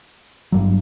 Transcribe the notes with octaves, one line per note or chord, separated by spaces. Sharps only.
G1 G2 F#3